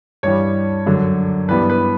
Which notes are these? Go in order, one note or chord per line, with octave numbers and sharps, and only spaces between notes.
G2 E3 G3 C#5
F#2 D3 F#3
G2 E3 G3 B3 B4
B4